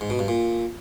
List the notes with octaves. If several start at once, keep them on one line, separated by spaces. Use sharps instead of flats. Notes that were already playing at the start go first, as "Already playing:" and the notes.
G#2
B2
G2
A#2